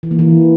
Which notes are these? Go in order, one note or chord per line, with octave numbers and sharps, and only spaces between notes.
E3
A#3
E3